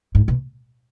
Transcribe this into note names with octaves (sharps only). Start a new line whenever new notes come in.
G#2
B2